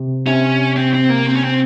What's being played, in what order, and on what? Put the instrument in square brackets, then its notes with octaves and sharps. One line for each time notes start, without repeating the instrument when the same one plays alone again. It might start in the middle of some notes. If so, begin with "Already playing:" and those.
Already playing: [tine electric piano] C3
[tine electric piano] C3 [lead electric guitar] C#4
[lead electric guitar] C4
C4
A#3
C4
C#4
C4